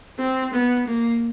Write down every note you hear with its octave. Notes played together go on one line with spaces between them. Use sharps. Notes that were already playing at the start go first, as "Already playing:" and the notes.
C4
B3
A#3